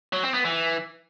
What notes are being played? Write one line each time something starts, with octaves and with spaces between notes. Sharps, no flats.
F#3
C4
B3
E3